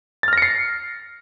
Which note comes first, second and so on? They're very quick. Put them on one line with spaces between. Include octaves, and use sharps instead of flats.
A6 F6 A#6 C#7 C7